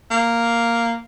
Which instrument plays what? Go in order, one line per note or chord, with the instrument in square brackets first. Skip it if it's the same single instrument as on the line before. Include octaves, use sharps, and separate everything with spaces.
[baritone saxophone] A#3